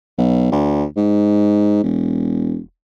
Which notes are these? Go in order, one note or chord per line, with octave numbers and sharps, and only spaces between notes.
B1
D2
G#2
E1